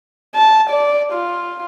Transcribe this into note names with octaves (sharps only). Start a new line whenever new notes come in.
A5
D5
F4